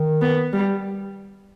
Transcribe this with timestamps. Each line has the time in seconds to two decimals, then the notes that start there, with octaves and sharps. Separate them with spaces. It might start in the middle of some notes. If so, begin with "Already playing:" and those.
Already playing: D#3
0.22 B3
0.53 G3